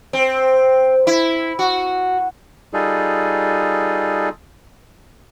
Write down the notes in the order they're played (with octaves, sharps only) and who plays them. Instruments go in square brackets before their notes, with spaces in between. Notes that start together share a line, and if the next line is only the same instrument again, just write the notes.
[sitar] C4
E4
F#4
[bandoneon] G3 D#4 F4 G#4 A4